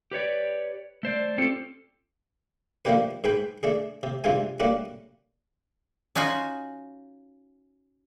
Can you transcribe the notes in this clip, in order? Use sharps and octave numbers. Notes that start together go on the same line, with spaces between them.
G4 B4 C#5 D5
A3 C5 D5
C4 C#4 F4 G4 A4
F3 A3 A#3 D4 G4 B4
G#2 G#4 B4 G5 B5
A3 D4 G#4
C3
G2 C3 E3 G#3 F4 G#5
G3 A3 A#3 C#4 D4 F#4
C#4 D#4 F4 F#4 G#5